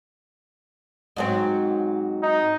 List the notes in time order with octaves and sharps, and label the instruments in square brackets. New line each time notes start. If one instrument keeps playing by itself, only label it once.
[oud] G#2 F#3 C4
[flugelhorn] D#4